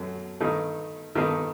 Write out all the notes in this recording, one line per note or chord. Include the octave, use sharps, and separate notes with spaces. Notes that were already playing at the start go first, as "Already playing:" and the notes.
Already playing: F#2 F#3 A3
G2 D#3 A3 D#4
G2 D#3 A3 D#4